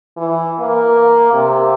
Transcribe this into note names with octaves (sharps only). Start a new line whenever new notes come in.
E3
A#3
C3